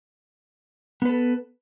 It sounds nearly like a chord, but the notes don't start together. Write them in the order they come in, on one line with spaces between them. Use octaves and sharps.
B3 B4 A4